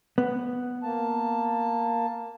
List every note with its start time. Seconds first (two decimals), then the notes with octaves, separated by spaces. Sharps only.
0.18 B3
0.83 A#3 A5